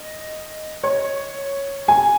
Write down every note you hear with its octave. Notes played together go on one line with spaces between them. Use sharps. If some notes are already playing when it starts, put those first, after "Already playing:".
Already playing: D#5
C#5
G#5